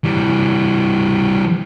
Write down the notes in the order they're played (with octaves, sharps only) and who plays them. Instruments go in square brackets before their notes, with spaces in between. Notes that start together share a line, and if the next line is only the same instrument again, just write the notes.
[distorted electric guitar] E3 G3